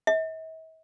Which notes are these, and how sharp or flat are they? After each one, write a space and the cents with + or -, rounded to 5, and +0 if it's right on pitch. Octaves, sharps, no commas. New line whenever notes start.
E5 -45